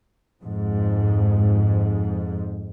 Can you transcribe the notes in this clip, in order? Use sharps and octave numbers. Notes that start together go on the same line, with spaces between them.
F2 G#2